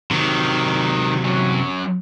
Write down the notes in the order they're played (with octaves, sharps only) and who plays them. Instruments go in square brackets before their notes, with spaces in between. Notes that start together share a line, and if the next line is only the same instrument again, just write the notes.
[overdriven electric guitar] C3 F#3 [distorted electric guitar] D#3
[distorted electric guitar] F#2 C#4